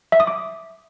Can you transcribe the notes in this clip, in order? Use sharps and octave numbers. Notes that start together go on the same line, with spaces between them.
E5
D#6
D6